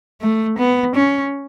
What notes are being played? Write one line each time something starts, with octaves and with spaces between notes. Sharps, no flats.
A3
B3
C#4